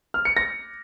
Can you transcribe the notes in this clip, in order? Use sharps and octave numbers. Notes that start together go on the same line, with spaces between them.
F6
C#7
A#6